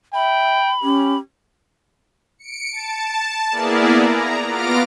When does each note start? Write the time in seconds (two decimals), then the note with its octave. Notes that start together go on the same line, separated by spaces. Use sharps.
0.14 E5 G5 B5
0.83 C#4 G4
2.39 C#7 D7
2.72 A5
3.51 A#3 B3 E4 G#4 A#4 D5
4.03 A#5
4.46 B3 F4 D6 F6 A#6 D7